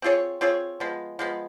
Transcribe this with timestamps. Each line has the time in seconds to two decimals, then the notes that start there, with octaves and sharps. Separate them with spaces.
0.02 C4 F4 G#4 C#5
0.41 C4 F4 G#4 C#5
0.80 F3 G#3 B3
1.19 F3 G#3 B3